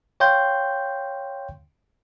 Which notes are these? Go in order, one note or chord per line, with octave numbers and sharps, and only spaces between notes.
C#5 F5 G5 C6 G6